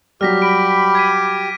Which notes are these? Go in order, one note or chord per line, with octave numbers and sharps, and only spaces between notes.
F#3 G3 G4 F6 A#6 B6
B5 D7
G#6 B6 D#7